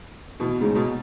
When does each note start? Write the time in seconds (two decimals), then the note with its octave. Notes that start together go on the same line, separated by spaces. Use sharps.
0.40 B2 E3
0.60 G#2 C#3
0.75 B2